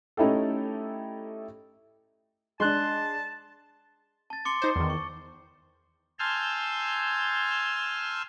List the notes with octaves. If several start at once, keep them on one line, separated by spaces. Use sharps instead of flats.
A3 C#4 D#4 E4 G4 A4
G#3 D4 A5 C6 F#6
A5 A6
C6 D6 C#7 G7
D#4 C5
E2 D#3
C#6
G#5 A5 C6 E6 F6 G6